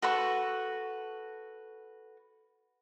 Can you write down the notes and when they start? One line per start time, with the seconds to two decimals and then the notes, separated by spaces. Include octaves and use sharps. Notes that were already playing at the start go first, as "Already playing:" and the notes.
0.02 F#4 A4 B4 C#6